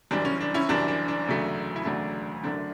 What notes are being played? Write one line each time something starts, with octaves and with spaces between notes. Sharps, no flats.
F#1 F#2 E3 G3 D4
C#4
D4
C#4 E4
F#1 F#2 E3 G3 D4
D4
D4
E1 D2 C#3 F#3 A3
E4
E1 D2 C#3 F#3 A3 D4
F#1 F#2 D3 F#3 A3 D4